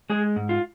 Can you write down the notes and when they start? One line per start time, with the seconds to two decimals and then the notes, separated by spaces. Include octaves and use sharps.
0.10 G#3 G#4
0.36 G#2
0.49 F4